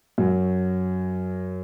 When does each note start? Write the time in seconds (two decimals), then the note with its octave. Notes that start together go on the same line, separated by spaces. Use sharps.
0.18 F#2 F#3